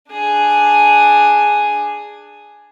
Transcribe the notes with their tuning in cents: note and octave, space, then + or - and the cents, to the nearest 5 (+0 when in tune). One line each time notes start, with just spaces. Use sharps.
D4 +10 G#4 +0